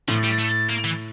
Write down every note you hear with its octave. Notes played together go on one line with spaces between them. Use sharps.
A2 F3
G3
A3
A#3
E3